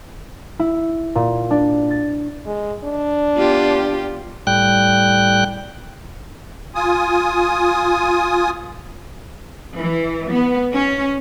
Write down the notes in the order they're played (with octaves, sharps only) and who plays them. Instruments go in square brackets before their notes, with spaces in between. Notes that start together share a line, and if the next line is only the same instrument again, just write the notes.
[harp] E4
A#2
D4
A6
[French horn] G#3
D4
[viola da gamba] B3 F4 G4
[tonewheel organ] A2 G3 G5 F#6
[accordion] F4 G#5 D#6
[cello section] E3
B3
C#4